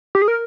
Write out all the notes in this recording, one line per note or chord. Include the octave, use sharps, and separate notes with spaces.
G4
G#4
A#4